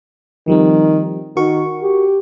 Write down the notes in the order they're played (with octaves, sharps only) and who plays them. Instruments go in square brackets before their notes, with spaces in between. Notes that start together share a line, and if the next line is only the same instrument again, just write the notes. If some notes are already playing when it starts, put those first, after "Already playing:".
[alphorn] D#3 [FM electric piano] F3 G3 C4
[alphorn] D#3 [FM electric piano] F#4 A#4 C#6
[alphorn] G4